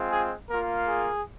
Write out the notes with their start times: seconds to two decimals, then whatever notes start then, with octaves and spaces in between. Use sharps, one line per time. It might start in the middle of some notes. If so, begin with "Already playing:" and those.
Already playing: G#3 C4 F4
0.09 G#4
0.48 A#3 F4 A#4
0.86 G#4